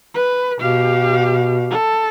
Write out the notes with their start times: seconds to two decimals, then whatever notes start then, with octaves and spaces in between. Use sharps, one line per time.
0.14 B4
0.60 B2 G4 F5
1.70 A4